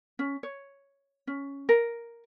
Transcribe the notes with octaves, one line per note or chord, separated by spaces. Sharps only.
C#4
C#5
C#4
A#4